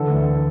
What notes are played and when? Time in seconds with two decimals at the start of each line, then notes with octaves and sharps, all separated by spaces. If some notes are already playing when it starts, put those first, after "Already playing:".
Already playing: D3 E3 A4
0.10 D2